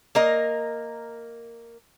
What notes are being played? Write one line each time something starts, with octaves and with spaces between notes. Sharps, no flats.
A#3 A#4 D#5